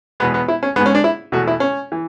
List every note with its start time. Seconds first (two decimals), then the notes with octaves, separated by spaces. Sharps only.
0.20 E2 B2 G#3 B3
0.34 B3
0.48 E4
0.63 C#4
0.76 G#2 B3
0.80 G#3
0.86 C#4
0.95 D4
1.04 E4
1.32 E2 B2 A3 F#4
1.47 E4
1.60 C#4
1.92 E3